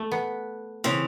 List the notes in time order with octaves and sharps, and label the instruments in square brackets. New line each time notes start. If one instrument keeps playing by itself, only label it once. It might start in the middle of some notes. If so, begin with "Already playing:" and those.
Already playing: [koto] A3
B3
[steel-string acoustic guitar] C#3 E3 [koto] C4